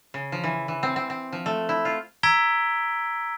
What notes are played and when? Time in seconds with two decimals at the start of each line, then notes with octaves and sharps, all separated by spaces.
0.14 C#3
0.32 F3
0.44 E3
0.68 E3
0.83 C4
0.96 C4
1.10 C4
1.33 F3
1.46 A3
1.69 E4
1.85 F4
2.23 A#5 E6 G#6 B6 D7 G7